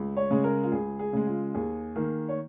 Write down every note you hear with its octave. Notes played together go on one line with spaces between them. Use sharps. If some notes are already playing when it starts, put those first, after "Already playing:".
Already playing: C#2
C#5
C#3 G#3
A#4
F4
C#2 G#4
G#4
C#3 G#3
F4
D#2 G#4
D#3 A#3
C#5